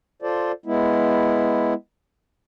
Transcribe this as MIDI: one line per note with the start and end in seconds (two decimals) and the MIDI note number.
0.22 0.52 65
0.22 0.52 69
0.22 0.52 72
0.22 0.52 74
0.66 1.74 56
0.66 1.74 59
0.66 1.74 64